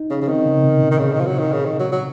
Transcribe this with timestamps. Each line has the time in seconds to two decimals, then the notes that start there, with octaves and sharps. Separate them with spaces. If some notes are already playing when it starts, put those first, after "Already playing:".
Already playing: D#4
0.10 C#3 C#4
0.21 C#3
0.28 D#3 C4
0.46 C#3
0.64 C3
0.81 A#2
0.91 D#3
0.99 C#3
1.12 D#3
1.20 F3
1.26 F#3
1.39 D#3
1.52 C#3
1.65 D#3
1.79 F#3
1.92 F#3